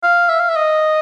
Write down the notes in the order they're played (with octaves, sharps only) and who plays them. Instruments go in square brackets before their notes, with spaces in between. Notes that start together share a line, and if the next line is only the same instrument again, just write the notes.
[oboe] F5
E5
F5
E5
D#5